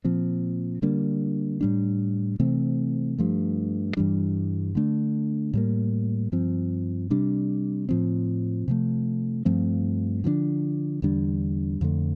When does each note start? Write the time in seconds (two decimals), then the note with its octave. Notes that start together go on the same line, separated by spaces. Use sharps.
0.05 A#2 F3 C4
0.82 D3 G3 A#3 D4
1.61 A2 G3 D4
2.40 C3 E3 A3 C4
3.18 G2 F3 A3
3.97 G2 E3 G3 D4
4.75 D3 A3 D4
5.53 A2 G3 A#3
6.32 G2 F3 C4
7.10 C3 G3 D4
7.89 A2 F3 C4
8.68 C3 F3 A3
9.45 G2 F3 A3 C4
10.24 D3 F3 A#3 D4
11.02 E2 D3 G3 D4
11.81 F2 D3 A3